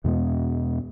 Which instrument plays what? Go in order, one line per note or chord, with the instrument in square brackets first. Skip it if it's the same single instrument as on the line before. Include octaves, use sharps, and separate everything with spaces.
[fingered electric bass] E2 B2 G#3 B3